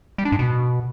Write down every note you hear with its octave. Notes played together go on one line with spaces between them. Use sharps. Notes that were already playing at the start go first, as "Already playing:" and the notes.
G3
D4
G#2
B2